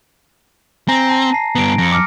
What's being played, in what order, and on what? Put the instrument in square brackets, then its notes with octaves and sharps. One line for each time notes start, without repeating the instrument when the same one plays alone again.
[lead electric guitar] C4 [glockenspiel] G#5 A#5 A#6
[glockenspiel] A5 A#5
A5 C7
[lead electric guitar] G2 B3 [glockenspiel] A#5 D7
[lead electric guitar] F2 [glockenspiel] A#6 C#7
[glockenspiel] D6 F6 C#7